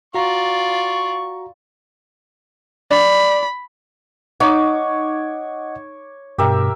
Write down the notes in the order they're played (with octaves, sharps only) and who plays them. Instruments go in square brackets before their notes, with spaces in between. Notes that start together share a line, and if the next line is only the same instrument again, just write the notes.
[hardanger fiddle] F4 D5 [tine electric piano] F#4 A#5 [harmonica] C#6
[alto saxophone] D5 [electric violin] B5
[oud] D#4 [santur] C#5 D6 [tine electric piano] D#5 F#5
[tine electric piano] G2 B2 [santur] G4 A#4 E5